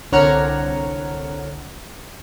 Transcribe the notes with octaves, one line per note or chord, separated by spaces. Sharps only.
C2 D3 C#5 F#5 A#5 F6